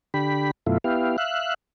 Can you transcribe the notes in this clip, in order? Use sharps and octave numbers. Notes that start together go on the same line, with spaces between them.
D3 G4 B5
F#2 B2 A3 E4 F4
B3 E4 G4 F5
E5 F5 F#6